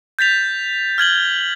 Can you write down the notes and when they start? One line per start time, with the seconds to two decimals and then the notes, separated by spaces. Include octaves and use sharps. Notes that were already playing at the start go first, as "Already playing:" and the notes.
0.19 G6 A6 B6 F7
0.98 F6 G#6 F#7 G7